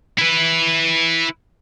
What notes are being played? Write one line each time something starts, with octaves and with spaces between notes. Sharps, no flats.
E4 B4